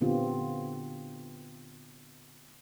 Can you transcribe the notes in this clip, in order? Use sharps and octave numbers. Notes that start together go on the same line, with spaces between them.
A#2 D3 B3 C4 F4 G4